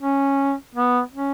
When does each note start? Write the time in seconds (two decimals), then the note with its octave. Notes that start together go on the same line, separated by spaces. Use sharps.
0.01 C#4
0.75 B3
1.13 C#4